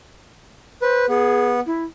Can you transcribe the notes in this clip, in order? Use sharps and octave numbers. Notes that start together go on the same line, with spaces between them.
B4 C5
B3 G#4
E4